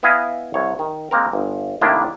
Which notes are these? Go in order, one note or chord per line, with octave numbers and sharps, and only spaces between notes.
B3 E4 D#5 F5 G#5
C2 C#5
D#3
G#3 A#3 C4 A#4
G1
A2 C3 D#3 A#3 D4 E4